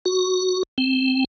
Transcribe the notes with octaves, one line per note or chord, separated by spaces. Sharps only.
F#4
C4